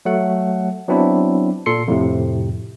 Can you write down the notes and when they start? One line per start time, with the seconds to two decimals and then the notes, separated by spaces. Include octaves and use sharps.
0.05 F#3 A3 F#5
0.88 F#3 B3 C4 D4 E4
1.66 A#2 A4 C6 C7 C#7
1.88 F2 A2 C3